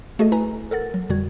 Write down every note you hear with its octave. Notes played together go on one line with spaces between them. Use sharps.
A3 F#4 G#4 A4 D#5
E4 B4 G#5 A#5
A4 A#4 F#5 A6
F#3
F2 B2 D3 G3 F#4 G#6